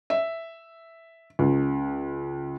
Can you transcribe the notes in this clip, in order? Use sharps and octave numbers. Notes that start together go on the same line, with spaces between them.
E5
C#2